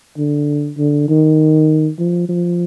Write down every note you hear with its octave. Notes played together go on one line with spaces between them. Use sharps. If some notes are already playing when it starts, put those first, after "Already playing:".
D3
D3
D#3
F3
F3